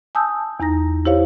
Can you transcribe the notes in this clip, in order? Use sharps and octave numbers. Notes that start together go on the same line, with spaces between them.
G#5 A5 D#6 E6 G6
E2 D#4 A#5 A#6
E4 G4 C5 C#5 F5